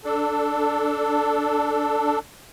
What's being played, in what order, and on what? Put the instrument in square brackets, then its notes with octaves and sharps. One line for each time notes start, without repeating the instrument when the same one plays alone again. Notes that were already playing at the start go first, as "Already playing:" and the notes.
[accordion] D4 A4